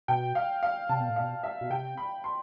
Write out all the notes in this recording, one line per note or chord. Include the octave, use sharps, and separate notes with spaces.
B2 G5
F5
F5
C3 A5
B2
A2
B2 F5
E5
B2
C3 G5
B5
C6